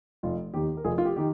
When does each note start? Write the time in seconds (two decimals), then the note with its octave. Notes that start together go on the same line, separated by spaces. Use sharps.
0.23 F1 F4
0.54 D#2 D#3 G4
0.77 A#4
0.84 F1 F4 G#4
0.98 F4
1.05 G4
1.16 D#3 G4